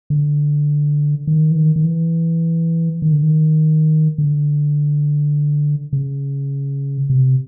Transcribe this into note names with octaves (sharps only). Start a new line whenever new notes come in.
D3
D#3
E3
D#3
D#3
E3
D#3
D3
D#3
D3
C#3
C3